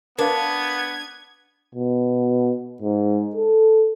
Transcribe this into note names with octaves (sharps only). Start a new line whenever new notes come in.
B3 D4 A#4 B4 F5 G#6
B2
G#2
A4